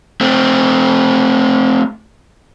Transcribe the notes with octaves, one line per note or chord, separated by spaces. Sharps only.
A3 C4